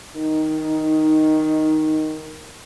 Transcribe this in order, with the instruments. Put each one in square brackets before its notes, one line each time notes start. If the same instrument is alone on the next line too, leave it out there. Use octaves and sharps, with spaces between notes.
[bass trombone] D#3 [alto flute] D#4